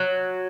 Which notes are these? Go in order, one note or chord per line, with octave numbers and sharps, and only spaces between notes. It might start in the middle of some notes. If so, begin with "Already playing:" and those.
Already playing: F#3